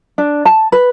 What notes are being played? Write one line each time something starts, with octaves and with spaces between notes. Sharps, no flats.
D4
A5
B4